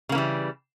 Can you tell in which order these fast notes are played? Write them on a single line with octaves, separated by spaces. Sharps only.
C#3 A#3 E3 G3